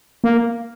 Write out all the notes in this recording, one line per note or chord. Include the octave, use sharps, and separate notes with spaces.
A#3